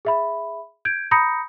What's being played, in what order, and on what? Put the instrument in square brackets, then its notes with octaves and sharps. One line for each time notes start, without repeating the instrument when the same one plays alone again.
[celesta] G#4 E5 B5
G6 G#6 D7
A#5 B5 D#6 G6 A#6 C#7